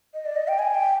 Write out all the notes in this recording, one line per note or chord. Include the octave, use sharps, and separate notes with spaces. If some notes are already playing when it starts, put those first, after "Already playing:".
D#5
D5
D#5
G5
G#5
G5